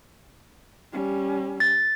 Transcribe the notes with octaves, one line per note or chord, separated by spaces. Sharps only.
G3 C#4
A6